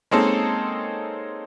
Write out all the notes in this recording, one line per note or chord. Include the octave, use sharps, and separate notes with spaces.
G#3 A#3 C4 C#4 D#4 A4